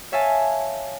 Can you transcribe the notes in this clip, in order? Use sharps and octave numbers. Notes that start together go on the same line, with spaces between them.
C#5 E5 F5 G#5 A5